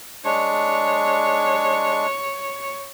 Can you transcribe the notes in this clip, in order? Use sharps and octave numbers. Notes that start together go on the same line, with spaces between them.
G#3 D4 C#5